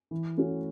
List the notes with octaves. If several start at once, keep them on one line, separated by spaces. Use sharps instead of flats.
E3
A3 C#4 F#4